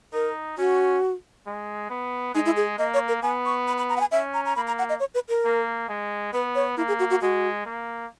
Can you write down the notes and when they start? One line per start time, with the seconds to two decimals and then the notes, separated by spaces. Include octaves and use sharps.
0.13 D#4 A#4
0.58 C#4 F#4
1.46 G#3
1.90 B3
2.35 G#3 D#4
2.46 E4
2.56 G#4
2.78 A#3 D#5
2.94 C#5
3.08 A#4
3.23 B3 G#5
3.46 C#6
3.67 B5
3.78 B5
3.89 A#5
3.97 F#5
4.01 G#5
4.12 C#4 E5
4.34 A#5
4.46 A#5
4.56 A#3 B5
4.67 A#5
4.78 F#5
4.89 D#5
5.00 C#5
5.15 B4
5.29 A#4
5.45 A#3
5.89 G#3
6.33 B3 B4
6.55 C#5
6.77 A#3 E4
6.88 G#4
6.99 F#4
7.10 F#4
7.21 G#3 F#4
7.66 A#3